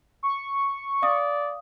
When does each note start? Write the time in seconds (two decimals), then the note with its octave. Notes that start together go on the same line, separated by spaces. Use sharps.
0.23 C#6
1.03 D5 F5 D#6